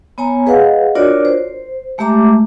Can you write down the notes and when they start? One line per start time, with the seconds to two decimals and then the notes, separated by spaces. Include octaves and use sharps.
0.18 B3 C#5 G#5 A#5
0.46 G#4 B4 D#5 F5 F#5
0.95 D4 F4 F#4 A#4 C#5 D5
1.25 C5
1.98 G#3 A3 G4 E5 A#5 D6